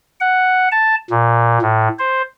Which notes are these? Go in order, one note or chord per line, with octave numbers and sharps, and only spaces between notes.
F#5
A5
A#2
A2
C5